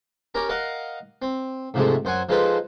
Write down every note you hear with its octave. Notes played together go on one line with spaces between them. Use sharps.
C#4 G4 A#4 A#5
A#4 D#5 F5 F#5
C4
G#2 C3 F3 G#3 A3
F#2 C5 F#5 G#5
F3 G#3 D#4 A4 B4 C5